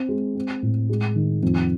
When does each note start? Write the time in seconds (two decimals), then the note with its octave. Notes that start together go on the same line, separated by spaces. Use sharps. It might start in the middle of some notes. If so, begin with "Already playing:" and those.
Already playing: C4
0.09 G#3
0.35 C4
0.62 A2
0.90 G#3
1.16 D#3
1.43 F2